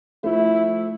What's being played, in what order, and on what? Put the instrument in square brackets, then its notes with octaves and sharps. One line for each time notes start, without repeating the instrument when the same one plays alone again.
[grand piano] F3 A3 [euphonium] E4